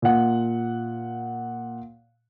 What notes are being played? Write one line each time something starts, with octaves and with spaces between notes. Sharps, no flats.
A#2 F#5